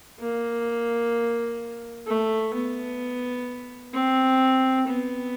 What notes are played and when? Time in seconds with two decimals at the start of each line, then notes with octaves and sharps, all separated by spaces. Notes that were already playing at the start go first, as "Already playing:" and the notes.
0.20 A#3
2.07 A3
2.54 B3
3.94 C4
4.88 B3